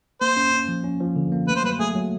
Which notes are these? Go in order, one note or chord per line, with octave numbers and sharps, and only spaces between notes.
A#3 C5
C#4
C#4
F3
C#4
F3
D3
A#3
A3 B4
C5
F#3 B4
A3 G#4
F#3